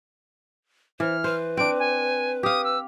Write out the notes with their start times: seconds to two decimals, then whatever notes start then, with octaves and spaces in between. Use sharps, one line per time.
1.00 E3 C5 F6
1.24 B4 C5
1.57 C4 D4 D7
1.79 G#5
2.43 G4 F5 D#6
2.64 E6